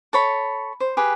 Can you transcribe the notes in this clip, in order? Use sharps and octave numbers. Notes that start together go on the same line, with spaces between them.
A4 C#5 B5
C5
G4 G#4 B4